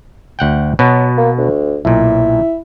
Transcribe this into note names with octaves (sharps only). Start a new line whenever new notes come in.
D2 F#5 G5
B2 F#3 B3
A#3
D2
B1 A#2 E4